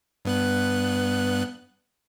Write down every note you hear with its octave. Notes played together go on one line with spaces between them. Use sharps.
G2 B3 F#6